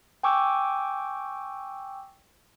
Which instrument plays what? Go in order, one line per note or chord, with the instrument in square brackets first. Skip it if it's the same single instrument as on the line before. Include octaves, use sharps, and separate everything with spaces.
[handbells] G5 G#5 C#6 D6 E6 G6